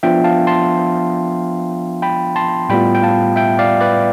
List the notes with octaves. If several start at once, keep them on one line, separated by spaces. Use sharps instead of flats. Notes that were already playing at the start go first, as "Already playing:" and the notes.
F3 B3 D4 F4 E5 G5
F5 A5
A5 C6
G5 B5
A5 C6
A2 G3 B3 F4 G5 B5
G5
F5 A5
E5 G5
D5 F5
B4 D5